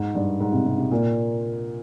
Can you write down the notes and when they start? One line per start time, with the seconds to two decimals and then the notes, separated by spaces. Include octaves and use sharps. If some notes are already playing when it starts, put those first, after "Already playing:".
Already playing: G#2
0.15 G2
0.40 G#2
0.52 C3
0.66 C3
0.78 C3
0.91 A#2